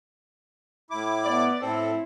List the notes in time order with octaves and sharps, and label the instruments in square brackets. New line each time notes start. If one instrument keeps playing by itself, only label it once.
[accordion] A2 E4 D6
[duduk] B3 [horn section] D5
[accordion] A2 A4 [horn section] C4 [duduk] E4